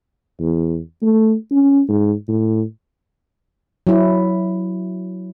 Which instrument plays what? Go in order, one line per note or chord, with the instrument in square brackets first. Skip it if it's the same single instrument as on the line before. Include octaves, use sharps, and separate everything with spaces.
[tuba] E2
A3
C#4
G#2
A2
[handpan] F#3 E4